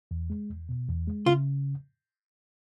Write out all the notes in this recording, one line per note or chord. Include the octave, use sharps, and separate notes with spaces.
E2
G#3
E2
B2
E2
G#3
C#3 F4